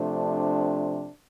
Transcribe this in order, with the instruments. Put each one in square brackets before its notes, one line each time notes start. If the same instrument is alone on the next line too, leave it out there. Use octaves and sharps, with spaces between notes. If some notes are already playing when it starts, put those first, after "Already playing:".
Already playing: [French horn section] C3 F3 A3 D4